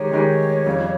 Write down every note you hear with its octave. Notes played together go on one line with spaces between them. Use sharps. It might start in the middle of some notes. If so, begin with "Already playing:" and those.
Already playing: D#3 G#3 D#4 G4 C#5
D#3 G#3 D#4 G4
F2 C#3 G3